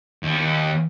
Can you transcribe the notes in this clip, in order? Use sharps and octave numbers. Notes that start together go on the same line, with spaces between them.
D#2